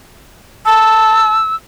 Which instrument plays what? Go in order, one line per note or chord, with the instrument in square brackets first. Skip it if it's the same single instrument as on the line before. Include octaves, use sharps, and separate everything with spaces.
[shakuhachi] A5 [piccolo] E6